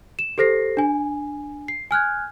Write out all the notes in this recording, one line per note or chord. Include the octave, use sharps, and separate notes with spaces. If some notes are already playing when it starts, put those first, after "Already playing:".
E7
G4 A4 C5 A#6 C7
D4 G#5
C7
G#5 F6 F#6 G#6